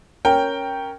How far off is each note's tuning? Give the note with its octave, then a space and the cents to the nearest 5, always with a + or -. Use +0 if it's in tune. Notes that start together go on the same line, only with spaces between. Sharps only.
C#4 +0 A#4 +0 G5 +0